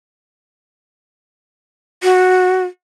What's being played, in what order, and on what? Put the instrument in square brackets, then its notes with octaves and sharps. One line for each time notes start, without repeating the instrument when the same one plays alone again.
[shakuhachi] F#4